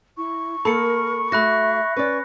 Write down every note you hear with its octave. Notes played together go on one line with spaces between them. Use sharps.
E4 C#6
A#3 A4 A#4 B5 C#7
A3 F#4 E5 B5 F#6 A#6
C#4 B4 D5 C#6